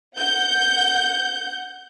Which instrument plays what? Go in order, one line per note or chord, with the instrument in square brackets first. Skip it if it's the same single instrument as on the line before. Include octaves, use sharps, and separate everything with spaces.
[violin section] F#5 G6